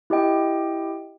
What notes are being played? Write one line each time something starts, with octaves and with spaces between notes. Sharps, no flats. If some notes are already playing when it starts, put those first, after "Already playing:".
E4 G4 D#5 G5